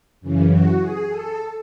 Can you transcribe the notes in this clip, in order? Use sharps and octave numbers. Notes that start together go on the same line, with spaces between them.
F#2 C#3 E3
F#4
G#4
A4